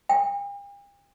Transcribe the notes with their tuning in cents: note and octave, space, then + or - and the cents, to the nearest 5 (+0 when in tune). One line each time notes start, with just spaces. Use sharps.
G5 +45